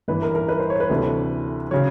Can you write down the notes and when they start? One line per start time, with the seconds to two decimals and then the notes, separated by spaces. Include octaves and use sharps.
0.08 G1 G2 E3 B4
0.22 A#4
0.35 A#4
0.49 B4
0.60 C5
0.70 C#5
0.80 B4
0.89 D2 C3 E3 A3 D4
1.71 C#3 F#3 C#5